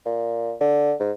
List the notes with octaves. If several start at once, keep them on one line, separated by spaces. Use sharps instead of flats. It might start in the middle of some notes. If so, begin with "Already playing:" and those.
A#2
D3
G#2